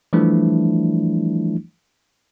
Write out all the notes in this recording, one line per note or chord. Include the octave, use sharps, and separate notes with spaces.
E3 F3 G3 A3 D4 E4